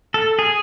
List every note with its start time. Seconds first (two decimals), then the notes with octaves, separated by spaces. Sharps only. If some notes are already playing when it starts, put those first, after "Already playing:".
0.14 A4
0.39 G#4